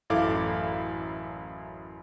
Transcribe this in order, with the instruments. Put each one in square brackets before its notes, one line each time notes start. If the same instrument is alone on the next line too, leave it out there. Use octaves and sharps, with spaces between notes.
[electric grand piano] A1 F#2 E4 A4 F5 D6